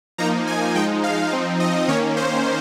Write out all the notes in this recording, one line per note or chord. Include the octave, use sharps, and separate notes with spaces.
F3 A#3 D#4 A#5
G#5
F3 G#3 D#4 G5
F5
F3 C4 D#4
D#5
D#3 A#3 C#4 C#5
C5